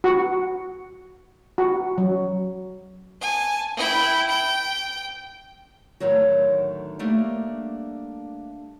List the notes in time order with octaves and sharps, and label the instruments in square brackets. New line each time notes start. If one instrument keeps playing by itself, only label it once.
[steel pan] F#4
F#4
F#3
[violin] G#5 A5
E4 G5
G5
[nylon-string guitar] A2 D3 D#3 F#3 F#4
G3 A3 A#3 D4